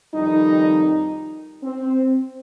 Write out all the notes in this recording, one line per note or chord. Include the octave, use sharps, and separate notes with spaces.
F2 D#3 G3 D#4
C4